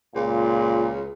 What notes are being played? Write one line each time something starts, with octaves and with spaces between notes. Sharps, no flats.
C#2 A#2